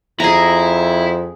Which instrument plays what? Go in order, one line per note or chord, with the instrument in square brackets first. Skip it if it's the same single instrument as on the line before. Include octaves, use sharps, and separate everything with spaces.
[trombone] F2 [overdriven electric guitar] E4 [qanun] G#4 A#5